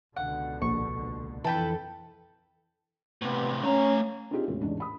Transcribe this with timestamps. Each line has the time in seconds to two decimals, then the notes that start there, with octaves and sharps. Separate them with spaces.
0.17 C#2 B2 D3 F#5
0.62 A#1 C#6
1.44 F2 E3 A4 B4 G5 B5
3.22 A2 C3 B3
3.63 A3 C#4 A#5
4.31 C4 D4 D#4 F4 G4 G#4
4.48 E1 A2 C#3
4.61 E2 G#2 C#4 D4
4.80 B5 D#6